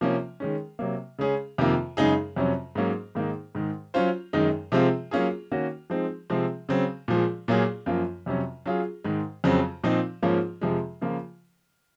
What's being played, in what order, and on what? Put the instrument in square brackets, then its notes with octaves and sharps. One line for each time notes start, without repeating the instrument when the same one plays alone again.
[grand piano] C3 F3 A#3 C#4
D#3 G#3 C#4
C3 F#3 A#3
C#3 G#3 C#4 G#4
F2 C3 D#3 A#3 F4
F#2 C#3 G#3 D#4 G#4
F2 C3 F#3 C#4
G#2 F#3 A#3 C#4
G#2 D#3 A#3 D#4
G#2 D#3 G#3
F#3 C#4 F4 C5
F#2 D#3 G#3 D#4
C3 F3 G#3 C4 F4
F#3 A#3 C#4 F4 G#4
D#3 A#3 C#4 F#4
F3 G#3 C4 D#4
C3 F3 G#3 C4
C#3 F#3 C4
A#2 F3 G#3
A#2 F#3 A#3 F4 G#4
F#2 F3 A#3 F4
F2 C3 F#3 C#4
F#3 C#4 F4 G#4
G#2 D#3 G#3
F2 C#3 F#3 C4
A#2 F3 C4 D#4
G#2 F3 A#3 C#4 F4
F2 C3 F3 G#3
C#3 F3 A#3 F4